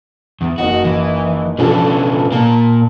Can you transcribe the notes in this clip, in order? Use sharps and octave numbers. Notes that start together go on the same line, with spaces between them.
E2
F#1 D#4 F#4
E3
B2 E3 F3 C#4 D4 A4
A#2 A#3 A5